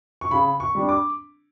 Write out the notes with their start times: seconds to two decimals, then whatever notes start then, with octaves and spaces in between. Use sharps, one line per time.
0.21 C#6
0.31 C#3 B5
0.60 C#6
0.75 G3 D4
0.89 D6